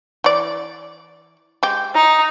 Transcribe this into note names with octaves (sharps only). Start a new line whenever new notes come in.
E3 D5
G#3 G4
D#4